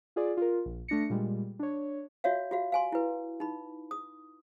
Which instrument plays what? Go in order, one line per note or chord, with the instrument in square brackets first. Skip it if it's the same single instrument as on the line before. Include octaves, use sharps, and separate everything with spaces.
[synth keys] F4 G#4 D5
F4 A#4
A#1
A3 D4 A#6 C#7
A#2 G3 G#3
D4 C#5
[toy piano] F4 F#4 C#5 E5 F5
F4 F#4 F5
F5 G#5 C6
E4 B4
D#4 B5
D#6